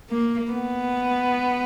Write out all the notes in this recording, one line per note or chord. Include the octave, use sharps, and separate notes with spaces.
A#3
B3